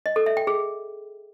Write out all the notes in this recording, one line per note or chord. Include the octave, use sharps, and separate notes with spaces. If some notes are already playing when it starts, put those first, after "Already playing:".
D#5
A4
E5
G5
G#4